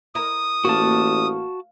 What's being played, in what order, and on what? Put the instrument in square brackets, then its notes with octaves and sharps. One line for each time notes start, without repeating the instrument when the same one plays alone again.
[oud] E4 A#4 [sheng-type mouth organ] D#6
[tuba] A1 [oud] A#3 [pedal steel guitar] F#4 A5